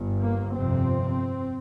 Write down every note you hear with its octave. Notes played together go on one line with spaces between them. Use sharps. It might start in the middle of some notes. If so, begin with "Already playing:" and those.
Already playing: G1 G2
A#3
G1 F2 C3 C4